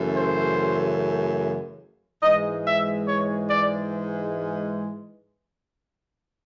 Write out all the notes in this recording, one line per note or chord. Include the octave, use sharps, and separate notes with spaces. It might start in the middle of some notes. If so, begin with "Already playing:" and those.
Already playing: F#2 C#3 E3 A3
C5
G#2 E3 G#3 D#5
E5
C#5
D5